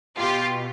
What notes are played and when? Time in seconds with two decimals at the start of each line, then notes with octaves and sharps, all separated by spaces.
0.19 B2 F4 G4